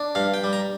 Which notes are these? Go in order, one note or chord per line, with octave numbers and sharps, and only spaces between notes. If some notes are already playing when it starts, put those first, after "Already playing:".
Already playing: D4
G2 F5
G5
G3
A#5